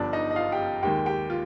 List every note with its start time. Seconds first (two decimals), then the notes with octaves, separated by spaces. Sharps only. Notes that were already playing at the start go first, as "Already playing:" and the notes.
Already playing: G1 G2 F3 D4 D5
0.13 D#4 D#5
0.31 D#5
0.36 F4 F5
0.52 G4 G5
0.83 D#2 D#3 G#3 G4 G5
1.06 G4 G5
1.30 F4